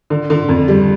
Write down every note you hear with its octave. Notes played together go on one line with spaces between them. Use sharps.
D3
D3
F2
G3